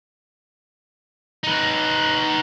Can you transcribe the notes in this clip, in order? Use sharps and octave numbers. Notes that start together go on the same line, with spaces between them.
D#4 B4